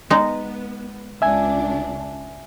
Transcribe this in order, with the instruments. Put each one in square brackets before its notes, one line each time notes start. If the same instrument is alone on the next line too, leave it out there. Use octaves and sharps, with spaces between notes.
[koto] G#3 D#4 [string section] B3
[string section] C#2 D4 [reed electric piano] E5 G#5